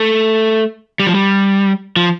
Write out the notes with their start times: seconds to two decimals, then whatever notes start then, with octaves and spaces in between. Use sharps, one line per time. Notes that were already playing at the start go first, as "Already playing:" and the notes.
Already playing: A3
1.00 G3
1.07 F3
1.15 G3
1.96 F3